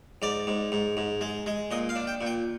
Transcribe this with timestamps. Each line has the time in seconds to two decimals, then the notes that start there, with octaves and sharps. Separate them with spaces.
0.22 G#2 D5
0.47 G#2
0.72 G#2
0.97 G#2
1.21 G#3
1.46 G#3
1.71 A#2 D#5
1.89 F5
1.96 D4
2.07 G5
2.21 A#2
2.26 G5